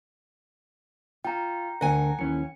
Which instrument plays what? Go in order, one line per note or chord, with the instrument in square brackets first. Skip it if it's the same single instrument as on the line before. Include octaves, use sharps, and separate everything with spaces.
[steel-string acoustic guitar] F4 [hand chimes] G5 A#5
[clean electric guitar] D2 D3 A#4 [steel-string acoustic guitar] F#5 G#5
[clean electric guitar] D#2 E3 C#4 [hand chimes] C#7